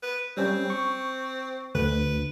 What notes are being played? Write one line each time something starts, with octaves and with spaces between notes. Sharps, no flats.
B4
G3 C4 C#4
C#6
D2 B4